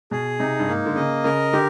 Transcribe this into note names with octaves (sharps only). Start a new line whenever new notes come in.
B2 G#4
C3 D#4
G2
G#2 A#3
D3
C#3 D#5
C#3 A#4
D3 G4